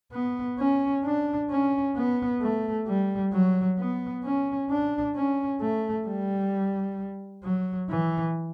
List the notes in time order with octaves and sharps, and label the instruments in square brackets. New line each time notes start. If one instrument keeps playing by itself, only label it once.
[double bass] B3
C#4
D4
C#4
B3
A3
G3
F#3
B3
C#4
D4
C#4
A3
G3
F#3
E3